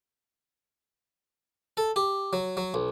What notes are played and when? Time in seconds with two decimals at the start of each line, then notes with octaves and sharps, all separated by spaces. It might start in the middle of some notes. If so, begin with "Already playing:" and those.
1.77 A4
1.96 G4
2.33 F#3
2.57 F#3
2.74 B1